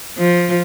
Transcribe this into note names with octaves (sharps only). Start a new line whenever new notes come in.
F3